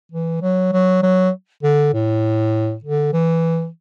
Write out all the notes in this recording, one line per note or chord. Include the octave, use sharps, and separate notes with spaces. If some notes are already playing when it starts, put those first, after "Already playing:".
E3
F#3
F#3
F#3
D3
A2
D3
E3